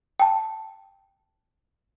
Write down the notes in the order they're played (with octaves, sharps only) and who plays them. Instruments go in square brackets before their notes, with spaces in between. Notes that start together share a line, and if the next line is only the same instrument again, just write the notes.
[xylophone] G5 A5